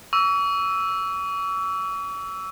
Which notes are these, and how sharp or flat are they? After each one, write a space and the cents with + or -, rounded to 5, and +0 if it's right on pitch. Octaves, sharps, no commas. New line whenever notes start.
C#6 +40 E6 +0